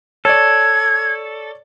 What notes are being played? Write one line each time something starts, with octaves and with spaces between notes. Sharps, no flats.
A4 C#5 D5 G#6